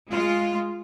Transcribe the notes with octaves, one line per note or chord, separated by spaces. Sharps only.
G#3 F4